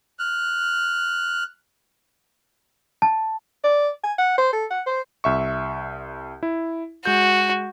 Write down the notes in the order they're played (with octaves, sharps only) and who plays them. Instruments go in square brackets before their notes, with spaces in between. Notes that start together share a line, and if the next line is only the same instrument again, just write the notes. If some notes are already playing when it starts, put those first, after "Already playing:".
[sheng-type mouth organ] F6 F#6
[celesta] A5
[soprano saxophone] D5
G#5
F#5
C5
A4
F#5
C5
[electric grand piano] C2 E5 C#6
E4
[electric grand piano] G#3 G6 [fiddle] F#4